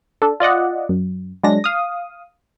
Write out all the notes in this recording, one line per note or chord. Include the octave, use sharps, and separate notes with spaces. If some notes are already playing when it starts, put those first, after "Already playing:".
D4 A4
F4 D5 D#5 F#5
F#2
F#3 G#3 D4 A#6
F5 D#6